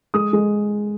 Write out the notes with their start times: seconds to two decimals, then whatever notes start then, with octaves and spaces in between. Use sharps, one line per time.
0.14 G#3 D#6
0.33 G#3